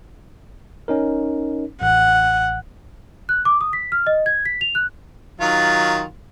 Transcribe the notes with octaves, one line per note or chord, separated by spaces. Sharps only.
C#4 D#4 A#4
A1 F#5
F#6
D6
D#6
B6
F6
D#5
G#6
B6
F7
F#6
D#3 F#3 F4